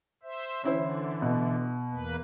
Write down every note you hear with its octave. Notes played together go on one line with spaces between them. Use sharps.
C5 E5
D3 E3 C#4 E4 C5
B2
E2 A#3 B4